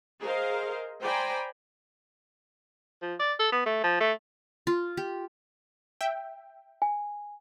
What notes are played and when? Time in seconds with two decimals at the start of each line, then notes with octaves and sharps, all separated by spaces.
0.21 G#4 A#4 C5 D#5 F5
1.02 C5 D5 G5 G#5 A#5 B5
3.02 F3
3.20 D5
3.39 A4
3.52 B3
3.66 A3
3.83 F3
4.00 A3
4.67 F4
4.97 G4
6.01 E5 G5
6.82 G#5